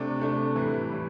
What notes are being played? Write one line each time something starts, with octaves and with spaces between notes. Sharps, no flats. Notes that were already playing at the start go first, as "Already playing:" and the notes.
Already playing: C3 A3 D4
C3 A3 D4
A2 E3 G3
A2 E3 G3